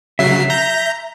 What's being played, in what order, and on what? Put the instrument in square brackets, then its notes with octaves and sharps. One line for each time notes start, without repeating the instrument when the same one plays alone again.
[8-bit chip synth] C#3 F#3 C7 [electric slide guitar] E5
[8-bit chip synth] A#5 G6 A#6